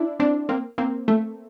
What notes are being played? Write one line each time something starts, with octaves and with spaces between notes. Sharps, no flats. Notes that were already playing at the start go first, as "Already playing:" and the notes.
Already playing: D4 E4
C4 D4
A#3 C4
A#3 C4
A3